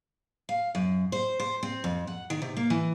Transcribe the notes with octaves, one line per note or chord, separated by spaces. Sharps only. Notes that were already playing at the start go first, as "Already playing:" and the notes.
F5
F#2
C5
C5
C4
F2
F#5
D#3
C3
A#3
E3